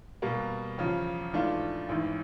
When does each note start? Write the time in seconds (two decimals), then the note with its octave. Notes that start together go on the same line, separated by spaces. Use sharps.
0.22 B2 G3 A#3
0.78 E2 C#3 F3
1.33 G#2 E3 A3 D4 F4
1.89 A1 G#2 E3